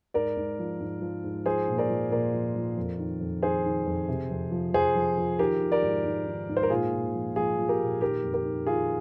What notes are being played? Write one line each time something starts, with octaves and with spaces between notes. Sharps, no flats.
G#2 A#4 D5
G#2
F3
G#2
F3
G#2
F3 G#4 C5
A#2
A#4 D5
F3
A#2 A#4 D5
F3
F3
F2
D#3
F2
D#3 G#4 C5
D#3
F2
C3
F2
F3
F2 G#4 C5
F3
F3
D#3 G4 A#4
D#3
A#4 D5
G#2
G#2
D#3
G#2
C5
A#4
A#2 F4 G#4
A#2
F3
F3 F4 G#4
F3
G4 A#4
A#2
D#3 G4 A#4
F2
G4 A#4
D#3
D#3 F4 G#4